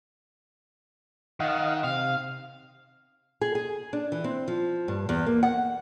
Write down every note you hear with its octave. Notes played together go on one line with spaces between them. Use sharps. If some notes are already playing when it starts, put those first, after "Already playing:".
D#3 D#5 F5 F#5
C3 F5
G#4
G#4
D4
E3
C4
F3
G2
E2
A#3
F#5